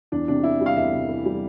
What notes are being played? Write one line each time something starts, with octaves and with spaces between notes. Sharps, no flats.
E2 D4
C3 D4
E3 E4
G3
F5
E2 E5
C3
E3
G3